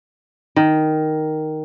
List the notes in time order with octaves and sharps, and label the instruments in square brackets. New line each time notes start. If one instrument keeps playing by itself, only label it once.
[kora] D#3